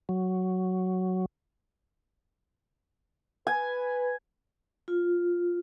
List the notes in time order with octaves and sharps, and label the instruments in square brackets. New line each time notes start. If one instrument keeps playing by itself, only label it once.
[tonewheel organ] F#3
[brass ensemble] B4 [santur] G#5
[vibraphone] F4